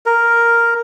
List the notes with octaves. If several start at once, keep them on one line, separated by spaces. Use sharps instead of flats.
A#4